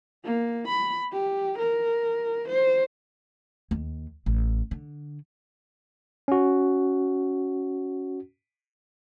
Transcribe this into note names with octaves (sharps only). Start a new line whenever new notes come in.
A#3
B5
G4
A#4
C5
D#2
A1
D3
C#4 F#4